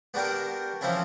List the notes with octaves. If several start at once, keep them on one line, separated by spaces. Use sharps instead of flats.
B3 D4 F#4 G4 A#4
E3 F3 C4 C#4 E4